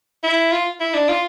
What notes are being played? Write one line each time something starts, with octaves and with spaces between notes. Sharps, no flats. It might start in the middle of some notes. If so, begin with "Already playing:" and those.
E4
F4
E4
D4
F4